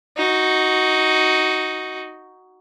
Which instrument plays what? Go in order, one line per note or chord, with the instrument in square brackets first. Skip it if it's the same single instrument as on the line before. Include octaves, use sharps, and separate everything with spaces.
[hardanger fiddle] D#4 F#4